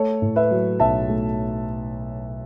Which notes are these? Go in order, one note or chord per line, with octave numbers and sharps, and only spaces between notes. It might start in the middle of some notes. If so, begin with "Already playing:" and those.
Already playing: A3 A4 C#5
A2
B4 E5
F#3
B1 E5 A5
A3